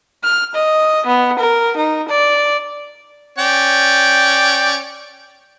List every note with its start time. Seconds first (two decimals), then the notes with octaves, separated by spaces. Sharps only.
0.24 F6
0.55 D#5
1.06 B3
1.39 A#4
1.77 D#4
2.08 D5
3.38 C#4 D5 G5